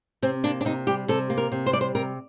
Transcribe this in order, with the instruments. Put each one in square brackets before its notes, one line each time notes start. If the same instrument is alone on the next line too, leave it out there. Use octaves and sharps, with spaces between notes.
[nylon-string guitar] C3 C4
A#3 D4
D4
C3 D#4
G3 G4
C3 A4
A#3
A#4
C3
C5
G3 D5
C5
C3 A#4